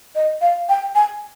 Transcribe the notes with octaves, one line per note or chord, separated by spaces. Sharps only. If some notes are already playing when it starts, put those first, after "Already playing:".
D#5
F5
G5
G#5